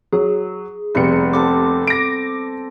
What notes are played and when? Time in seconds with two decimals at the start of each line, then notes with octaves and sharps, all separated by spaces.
0.13 F#3 G#4
0.95 F1 C3 G3 B3 C#7
1.33 C4 A4 C5 D6
1.87 A#6 D7